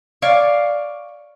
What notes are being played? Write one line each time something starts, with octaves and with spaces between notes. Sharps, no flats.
C#5 D5 F5